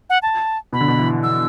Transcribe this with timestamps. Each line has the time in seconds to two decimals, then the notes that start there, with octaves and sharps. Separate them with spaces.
0.10 F#5
0.22 A5
0.73 B2 B5
0.81 D3
0.88 B2
0.98 E3
1.23 E6